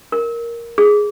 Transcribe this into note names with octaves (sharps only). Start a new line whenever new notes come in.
A#4
G#4